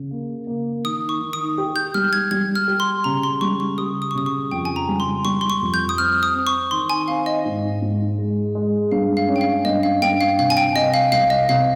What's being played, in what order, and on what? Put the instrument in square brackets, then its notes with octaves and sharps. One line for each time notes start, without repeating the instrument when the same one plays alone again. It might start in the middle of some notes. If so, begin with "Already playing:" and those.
Already playing: [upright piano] C#3
A#3
A#3
[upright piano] D#3 [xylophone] D#6
[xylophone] C#6
[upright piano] D#3
[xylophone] D#6
[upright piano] G4
[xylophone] G6
[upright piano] G3 [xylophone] F6
[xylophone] G#6
[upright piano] G3 [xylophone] G#6
[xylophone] F6
[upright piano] G4
[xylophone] C6
[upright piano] C#3 [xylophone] A#5
[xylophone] C6
[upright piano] G3 [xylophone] C#6
[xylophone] C#6
[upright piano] G4 [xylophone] D#6
[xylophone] D#6
C#6
[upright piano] C#3 [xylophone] D#6
[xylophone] C#6
[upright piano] F2 [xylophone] G5
[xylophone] G#5
A#5
[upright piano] G3
[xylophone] C6
[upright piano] G3 [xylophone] C#6
[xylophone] C6
C#6
[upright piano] F2
[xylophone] G6
D#6
[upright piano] C4 [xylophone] F6
[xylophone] D#6
[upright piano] C4
[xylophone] C#6
[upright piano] D#3 [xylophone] C6
[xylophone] G#5
[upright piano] C4 [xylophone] F5
[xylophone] D#5
[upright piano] G#2
G#2
G#3
G#3
[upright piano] G2 [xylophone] F5
[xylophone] F5
[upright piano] C#4
[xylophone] G5
F5
[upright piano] G2 [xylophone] D#5
[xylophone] F5
[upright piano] G2 [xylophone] G5
[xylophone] F5
[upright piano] C3 [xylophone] F5
[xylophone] G#5
G5
[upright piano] C3 [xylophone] D#5
[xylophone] F5
[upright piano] C2 [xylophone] F5
[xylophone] D#5
[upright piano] C3 [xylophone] F5